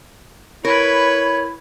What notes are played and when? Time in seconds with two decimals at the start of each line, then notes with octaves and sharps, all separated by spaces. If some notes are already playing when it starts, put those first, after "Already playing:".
0.65 E4 A#4 B4 C#5 C#6